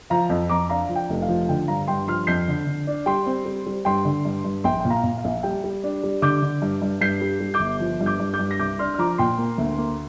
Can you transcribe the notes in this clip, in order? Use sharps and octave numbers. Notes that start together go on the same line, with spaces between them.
F3 F5 A#5
F2
F2 A#5 D6
D4 F5 A#5
F3
G5
F1
F5
F3
D3 G5
G2 F5 A#5
G2 G5 C6
F3 C6 F6
F2 G6 C7
D3
D3
D4
G3 G5 C6
C4
G3
G3
G2 G5 C6
D3
G2
G2
A#1 G5 C6
A#2 G5
F5 A#5
A#2
F5
A#1
G3 G5
G3
D4
G3
D3 D6 G6
D3
G2
G2
G2 G6 C7
G3
G3
D6 G6
G1
F3
G2
D6 G6
G2
D6 G6
G2
A#6
C2 D6 G6
D4 C6 F6
F6
F3 A#5 D6
A#2 G5 C6
A#3
D2
A#3